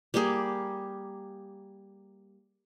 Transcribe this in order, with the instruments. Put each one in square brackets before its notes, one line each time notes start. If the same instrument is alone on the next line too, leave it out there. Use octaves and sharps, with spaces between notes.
[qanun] G3 A#3 G4 G#4